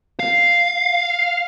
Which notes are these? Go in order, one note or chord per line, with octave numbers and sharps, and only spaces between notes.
F5